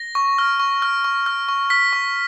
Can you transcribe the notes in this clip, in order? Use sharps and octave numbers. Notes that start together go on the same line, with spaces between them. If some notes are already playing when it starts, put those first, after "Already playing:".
Already playing: A#6
C#6
F6
C#6
F6
C#6
F6
C#6
F6 B6
C#6